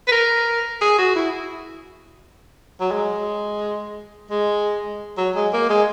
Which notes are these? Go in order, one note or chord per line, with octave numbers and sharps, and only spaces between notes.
B4
A#4
G#4
F#4
E4
F#3
G#3
G#3
F#3
G#3
A#3
G#3